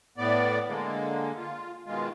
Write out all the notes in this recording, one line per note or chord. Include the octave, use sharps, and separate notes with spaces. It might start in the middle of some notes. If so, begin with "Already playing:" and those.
A2 B3 D5
D3 G#3 A#3
F4
B2 D#3 G#3 F4